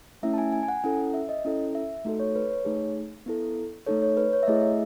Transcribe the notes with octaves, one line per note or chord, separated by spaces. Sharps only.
A3 C#4 E4 E5
A5
G#5
G#5
G#5
F#5
C#4 E4 A4 F#5
E5
D#5
C#4 E4 A4
E5
A3 D#4 F#4 A4
C#5
B4
C#5
A3 D#4 G#4
B3 E4 A4
A3 D#4 A4 C#5
C#5
B4
C#5
E5
A3 E4 G#4 D#5
E5